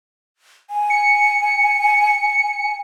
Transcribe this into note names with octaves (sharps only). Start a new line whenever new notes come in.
G#5
C#7